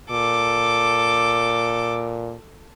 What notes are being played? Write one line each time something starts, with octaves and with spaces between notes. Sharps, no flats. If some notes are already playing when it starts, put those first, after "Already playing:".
A#2 A4 D6